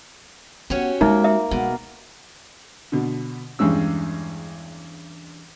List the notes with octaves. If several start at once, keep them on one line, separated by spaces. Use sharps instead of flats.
B3 C#4 F#4 G4
G#3 A#3 D#4 E5
E5
B2 G#3
B2 D3
E2 G2 G#3 C#4 E6